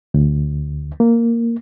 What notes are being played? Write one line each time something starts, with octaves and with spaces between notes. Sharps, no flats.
D2
A#3